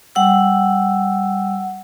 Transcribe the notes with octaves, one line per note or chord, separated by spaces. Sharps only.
G3 F#5 E6